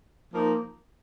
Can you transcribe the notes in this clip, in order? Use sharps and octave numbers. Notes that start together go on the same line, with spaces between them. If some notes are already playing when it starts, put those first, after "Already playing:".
F3 A#3 D#4